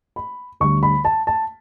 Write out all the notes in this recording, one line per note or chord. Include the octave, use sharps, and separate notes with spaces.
B5
D2 D3 G3 C#6
B5
A5
A5